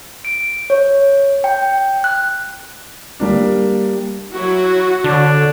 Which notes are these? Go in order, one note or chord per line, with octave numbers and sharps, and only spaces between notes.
D7
C#5
G5
F#6
G3 A#3 D4
F#3 E4 F#4
D3 D4 A4 C#5